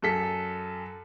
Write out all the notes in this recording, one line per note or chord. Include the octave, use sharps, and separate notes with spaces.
F#2 A4 B6